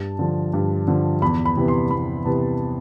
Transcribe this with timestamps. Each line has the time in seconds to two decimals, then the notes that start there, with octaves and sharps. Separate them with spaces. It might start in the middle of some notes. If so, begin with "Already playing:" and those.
Already playing: G2 A5
0.19 D3 F3
0.53 G2
0.87 D3 F3
1.22 E2 B5
1.45 B5
1.57 C3 E3 B3
1.68 C6
1.91 E2 B5
2.25 C3 E3 B3 A5